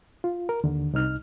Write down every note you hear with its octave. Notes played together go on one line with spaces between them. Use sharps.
F4
A#4
D#2 D3
C2 D#4 F6